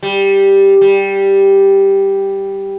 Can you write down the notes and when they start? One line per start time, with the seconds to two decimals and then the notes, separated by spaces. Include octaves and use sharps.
0.03 G3
0.81 G3